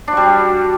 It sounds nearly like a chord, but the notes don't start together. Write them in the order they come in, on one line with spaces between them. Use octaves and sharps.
D4 F#4 G3